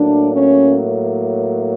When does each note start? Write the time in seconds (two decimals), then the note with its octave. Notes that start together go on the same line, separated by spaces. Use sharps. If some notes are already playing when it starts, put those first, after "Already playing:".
Already playing: A2 F#3 A#3 D4
0.33 C#4